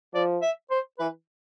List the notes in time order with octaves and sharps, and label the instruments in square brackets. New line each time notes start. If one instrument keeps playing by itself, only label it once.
[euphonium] F3 [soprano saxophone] D5
[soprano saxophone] E5
C5
[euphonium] E3 [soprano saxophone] B4